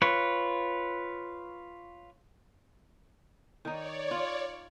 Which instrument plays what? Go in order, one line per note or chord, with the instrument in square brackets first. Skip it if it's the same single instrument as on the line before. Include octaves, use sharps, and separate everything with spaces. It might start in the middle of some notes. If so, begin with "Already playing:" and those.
[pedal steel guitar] F4 B4 C#5
[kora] D#3 D#4 [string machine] C#5 D5
[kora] F4